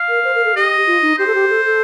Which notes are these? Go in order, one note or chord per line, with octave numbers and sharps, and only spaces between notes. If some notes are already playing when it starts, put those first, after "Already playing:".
Already playing: F5
A#4
C5
A#4
A4
G4 D#5
F4
D#4
G4 C5
A4
G4
A4
A4